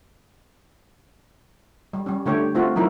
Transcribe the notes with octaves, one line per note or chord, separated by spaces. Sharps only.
G3
G3 C#4
D3 A3 G4 C#5
A3 C4 F4 F#4
F3 F#3 D#4 E4 A#4